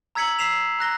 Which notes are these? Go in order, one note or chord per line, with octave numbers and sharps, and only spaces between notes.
A#5 E6 G#6 B6 C#7 F#7
E6 B6 C7 E7 F7
A#5 F#6 A#6 G7